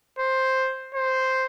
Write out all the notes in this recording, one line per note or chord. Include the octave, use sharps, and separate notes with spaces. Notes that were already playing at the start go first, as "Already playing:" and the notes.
C5
C5